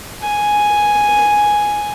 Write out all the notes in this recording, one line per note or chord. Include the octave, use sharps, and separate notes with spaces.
G#5